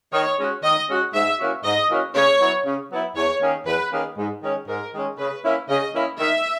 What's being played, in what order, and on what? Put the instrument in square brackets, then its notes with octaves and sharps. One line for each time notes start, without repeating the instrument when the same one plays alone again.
[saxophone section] D#3 [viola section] C#5
[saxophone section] G#3 C#4 F#4
[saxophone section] D#3 [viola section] D#5
[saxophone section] G#3 C#4 F#4
[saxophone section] G#2 [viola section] E5
[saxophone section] E3 A#3 C#4 F#4
[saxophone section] G#2 [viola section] D#5
[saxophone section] E3 A#3 C#4 F#4
[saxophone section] C#3 [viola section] C#5
[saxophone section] F#3 B3 E4
C#3
F#3 B3 E4
[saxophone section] E2 [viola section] C#5
[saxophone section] D#3 A#3 C#4 G#4
[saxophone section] E2 [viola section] B4
[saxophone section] D#3 A#3 C#4 G#4
G#2
D#3 G#3 C#4
[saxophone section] G#2 [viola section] A#4
[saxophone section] D#3 G#3 C#4
[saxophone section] C#3 [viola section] B4
[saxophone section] E3 A#3 C#4 E4
[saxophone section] C#3 [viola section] D#5
[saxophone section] E3 A#3 C#4 E4
[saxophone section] D#3 [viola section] E5